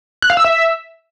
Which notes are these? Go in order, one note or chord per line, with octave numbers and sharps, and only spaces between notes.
F#6
F5
E6
E5